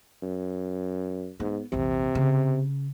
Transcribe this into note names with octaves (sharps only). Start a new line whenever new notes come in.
F#2
G#2 B3
A#1 E2 C3
C#3